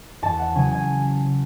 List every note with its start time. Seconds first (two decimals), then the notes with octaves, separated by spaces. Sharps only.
0.22 E2 A5
0.39 F#5
0.55 C#3 F#3 C#4 G#5
0.72 G#5